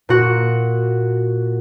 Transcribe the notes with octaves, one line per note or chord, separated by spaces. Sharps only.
A#2 F#4